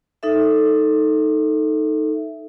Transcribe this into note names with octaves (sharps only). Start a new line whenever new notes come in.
D#4 A4 E5